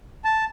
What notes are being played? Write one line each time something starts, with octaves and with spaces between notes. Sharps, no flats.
A5